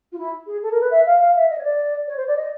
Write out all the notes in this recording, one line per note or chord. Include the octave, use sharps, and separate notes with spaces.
F4
E4
G#4
A4
A#4
B4
E5
F5
F5
E5
D#5
C#5
D5
C#5
C5
D5
D#5